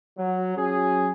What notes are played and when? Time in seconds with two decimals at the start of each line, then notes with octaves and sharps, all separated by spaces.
0.17 F#3
0.56 F#3 C#4 G#4